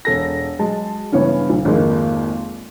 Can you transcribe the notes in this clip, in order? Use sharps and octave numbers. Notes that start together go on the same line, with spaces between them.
E1 A4 A#6
F#3 G#3 A5
G2 C#3 E3 B3 C#5
B1 C#3
G#1 F2 G#3 A#3 G#4